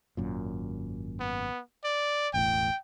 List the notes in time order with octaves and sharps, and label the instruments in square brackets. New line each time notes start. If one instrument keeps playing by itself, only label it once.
[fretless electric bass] G#1 F#2 A#2
[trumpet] B3
D5
[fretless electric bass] E1 A1 A2 [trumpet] G5